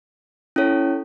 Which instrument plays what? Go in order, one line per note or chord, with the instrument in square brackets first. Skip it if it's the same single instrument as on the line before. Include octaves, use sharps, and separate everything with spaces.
[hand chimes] C#4 E4 A4 C#5